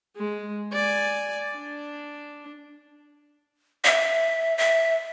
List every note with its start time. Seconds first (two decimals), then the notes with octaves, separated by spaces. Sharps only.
0.16 G#3
0.72 D5 G#5
1.56 D4
3.84 E5
4.58 E5